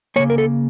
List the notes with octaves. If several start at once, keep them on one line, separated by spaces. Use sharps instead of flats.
C#3 F3 A#3 C#5
A#4
A4